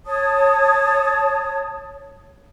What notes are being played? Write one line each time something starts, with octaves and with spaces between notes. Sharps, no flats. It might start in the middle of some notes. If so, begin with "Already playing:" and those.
C#5 A5 D#6